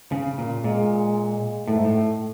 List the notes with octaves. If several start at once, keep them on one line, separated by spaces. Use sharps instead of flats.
C#3
A#2
A#2 G#3
A2 A3
G#2
A2